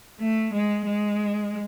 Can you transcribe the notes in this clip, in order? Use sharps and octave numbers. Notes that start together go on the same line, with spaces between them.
A3
G#3
G#3